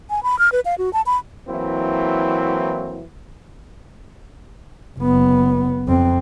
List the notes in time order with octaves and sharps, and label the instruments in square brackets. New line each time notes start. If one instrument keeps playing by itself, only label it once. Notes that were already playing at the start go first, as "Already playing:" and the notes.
[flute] G#5
B5
F6
B4
F5
F#4
A5
B5
[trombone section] E3 F#3 A#3 C4 E4
[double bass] F#1 B3
F2 C4